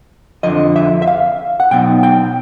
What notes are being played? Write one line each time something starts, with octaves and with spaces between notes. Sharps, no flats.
F2 D3 F3 D#5
E5
E5
F5
F#5
B2 F#3 B3 D#4 G5
G5